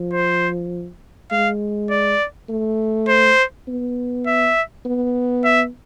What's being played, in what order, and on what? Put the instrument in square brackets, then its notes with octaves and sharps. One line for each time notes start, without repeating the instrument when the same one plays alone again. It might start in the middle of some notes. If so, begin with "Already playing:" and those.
Already playing: [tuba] F3
[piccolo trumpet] C5
[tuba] G#3 [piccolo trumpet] F5
[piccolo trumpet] D5
[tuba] A3
[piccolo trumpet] C5
[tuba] B3
[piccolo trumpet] E5
[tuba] B3
[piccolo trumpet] E5